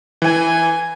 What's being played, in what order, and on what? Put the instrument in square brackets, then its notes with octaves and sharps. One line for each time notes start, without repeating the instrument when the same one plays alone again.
[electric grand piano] E3 [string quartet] G#5